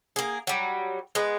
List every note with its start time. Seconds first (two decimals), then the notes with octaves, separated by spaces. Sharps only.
0.16 A#3 G#4
0.47 F#3 G3
1.15 G#3 B3